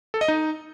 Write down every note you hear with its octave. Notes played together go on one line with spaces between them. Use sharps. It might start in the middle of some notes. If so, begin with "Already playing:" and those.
A4
D#5
D#4